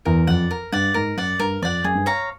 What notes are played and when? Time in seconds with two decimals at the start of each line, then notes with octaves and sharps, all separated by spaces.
0.05 E2 A#4
0.27 F2 D5 F#5
0.51 A#4
0.72 G2 D5 F#5
0.94 G#2 A#4
1.17 F#2 D5 F#5
1.39 G2 A#4
1.62 F2 D5 F#5
1.84 F#2 G#4
1.95 G2
2.06 C#5 F5 A#5